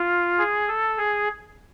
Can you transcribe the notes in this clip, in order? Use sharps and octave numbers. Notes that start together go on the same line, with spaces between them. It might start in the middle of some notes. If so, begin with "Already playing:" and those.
Already playing: F4
G#4
A4
G#4